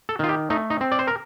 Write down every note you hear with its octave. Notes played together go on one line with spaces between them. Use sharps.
A4
D#3 F4
G4
A3 D#4
D#4
C4
D5
C5
A#4